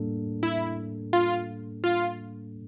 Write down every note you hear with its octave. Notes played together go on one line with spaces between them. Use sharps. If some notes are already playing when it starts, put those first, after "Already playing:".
Already playing: A2 G3 A#3 D4 A4
E4
F4
F4